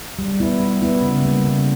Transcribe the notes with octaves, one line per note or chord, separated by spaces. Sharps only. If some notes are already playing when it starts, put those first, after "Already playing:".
G3
B3 E4
G3
B3 E4
C#3
G3 A#3
C#3